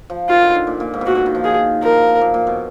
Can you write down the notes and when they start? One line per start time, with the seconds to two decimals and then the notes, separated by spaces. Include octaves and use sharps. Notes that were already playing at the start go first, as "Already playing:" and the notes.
0.10 F3
0.29 D#3 F4
0.42 D3
0.55 D3
0.67 A#2
0.80 A#2
0.94 G#2
1.01 B2
1.06 A#2 F#4
1.15 D3
1.26 D#3
1.35 F3
1.44 D#3 G#4
1.82 F3 A#4
2.21 A#2
2.34 A#2
2.47 B2